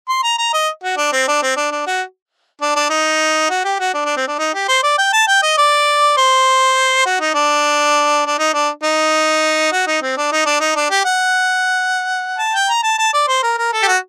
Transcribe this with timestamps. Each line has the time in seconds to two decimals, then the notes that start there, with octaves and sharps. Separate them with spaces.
0.09 C6
0.23 A#5
0.38 A#5
0.53 D#5
0.83 F#4
0.97 D4
1.12 C4
1.28 D4
1.42 C4
1.57 D4
1.72 D4
1.87 F#4
2.61 D4
2.76 D4
2.90 D#4
3.50 F#4
3.64 G4
3.79 F#4
3.94 D4
4.05 D4
4.17 C4
4.28 D4
4.39 D#4
4.54 G4
4.68 C5
4.83 D5
4.98 G5
5.13 A5
5.28 G5
5.43 D#5
5.58 D5
6.17 C5
7.06 F#4
7.20 D#4
7.34 D4
8.26 D4
8.39 D#4
8.54 D4
8.83 D#4
9.72 F#4
9.87 D#4
10.02 C4
10.17 D4
10.32 D#4
10.46 D4
10.60 D#4
10.76 D4
10.90 G4
11.05 F#5
12.38 A5
12.53 G5
12.69 A#5
12.83 A5
12.98 A5
13.13 D5
13.28 C5
13.43 A#4
13.58 A#4
13.73 A4
13.83 G4
13.88 F#4